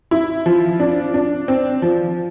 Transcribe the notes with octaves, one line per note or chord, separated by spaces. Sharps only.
E4
F3
D4
D4
C4
F3